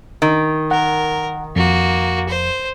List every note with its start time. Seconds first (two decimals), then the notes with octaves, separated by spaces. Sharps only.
0.22 D#3
0.71 A#4 F#5
1.56 F2 A#3 F#4
2.29 C5